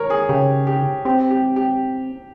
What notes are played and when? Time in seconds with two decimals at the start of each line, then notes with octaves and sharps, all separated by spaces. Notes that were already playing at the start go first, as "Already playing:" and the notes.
Already playing: A#4 C#5
0.10 G#4
0.29 C#3 G4
0.67 G4
1.05 C4 G4
1.31 G4
1.56 G4